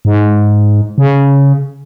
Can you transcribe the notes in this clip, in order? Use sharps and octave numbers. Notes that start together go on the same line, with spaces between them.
G#2
C#3